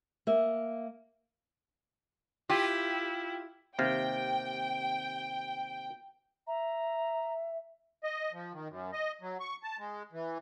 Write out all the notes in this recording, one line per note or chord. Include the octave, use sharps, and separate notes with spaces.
A#3 E5
E4 F4 G4
D#2 C3 F5 G5
E5 A#5
D#5
F3
D#3
F#2
D#5
F#3
C#6
A5
G#3
E3